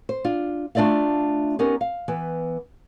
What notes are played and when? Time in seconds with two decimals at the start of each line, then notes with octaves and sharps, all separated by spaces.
0.09 C5
0.24 D4 F4
0.75 A3 D4 F4 D5 E5 F5
1.59 B3 C#4 D#4 G4 A#4
1.81 F5
2.08 E3 B3